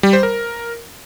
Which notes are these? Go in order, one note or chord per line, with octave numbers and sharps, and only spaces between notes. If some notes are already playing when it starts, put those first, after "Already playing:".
G3
C5
A#4